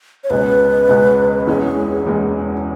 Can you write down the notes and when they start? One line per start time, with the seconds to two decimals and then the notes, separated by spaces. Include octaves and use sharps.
0.24 C#5
0.30 C#2 B2 G#3 C#4 B4
0.89 C#2 B2 G#3 C#4
1.47 E1 E2 E3 G#3 C#4 G#4
2.06 E1 E2 E3 G#3 C#4